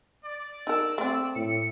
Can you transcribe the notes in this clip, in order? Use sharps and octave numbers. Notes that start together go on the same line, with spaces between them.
D5
D#4 A#4 E6
A3 C4
A2 C#7